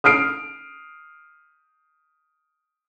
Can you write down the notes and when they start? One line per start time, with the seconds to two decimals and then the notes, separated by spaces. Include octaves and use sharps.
0.04 D#6 F6 C7 D7